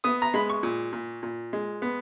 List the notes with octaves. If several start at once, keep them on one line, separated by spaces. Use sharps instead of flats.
B3 D#6
A#5
G#3 B5
C#6
A#2
A#2
A#2
G#3
B3